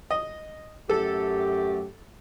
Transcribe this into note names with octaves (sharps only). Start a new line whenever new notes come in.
D#5
F#2 A3 G4 A4